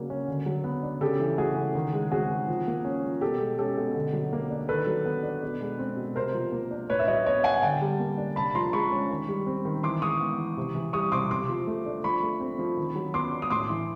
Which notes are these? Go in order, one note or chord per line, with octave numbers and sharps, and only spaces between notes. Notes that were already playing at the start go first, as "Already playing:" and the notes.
Already playing: C#3 F#3 A#3 D4
C#4
D3
F#3
B3
D4
C#3 G4 A4
E3
A3 F#4 G#4
C#3
D#3
G#3
C4 F#4 G#4
D#3
F3
A#3
C#4
F3
B2 G4 A4
G#3
C#4 G4 A4
B2
D3
F#3
A#3
D4
D#3 A4 B4
F#3
B3
D4
B2
G#3
C4
B2
C3 A#4 C5
F3
A#3
D4
A2 B4 C#5
E5
F#3 C#5 D#5
B3 C#5 D#5
D4 F#5 G#5
D3 G5 A5
G3
A#3
D4
C3 A5 B5
F3 A#5 C6
G#3 B5 C#6
C#4
D#3
G3
C4
D#3
E3 C6 D6
G#3 C#6 D#6
B3
E3
C3
E3
G3 C#6 D#6
C3 C6 D6
C3 C6 D6
F3
A3
D4
F3 B5 C#6
A3
C4
F3
D#3
F#3
B3 C6 D6
D4
D#6
A2 C6 D6
E3